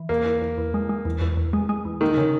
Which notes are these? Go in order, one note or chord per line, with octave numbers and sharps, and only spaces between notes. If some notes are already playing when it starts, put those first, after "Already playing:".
Already playing: E3
E2 A#3
E2
E2
E2
G#3
G#3
E2
E2
E2
G#3
G#3
E2
D#3 A#3
C#3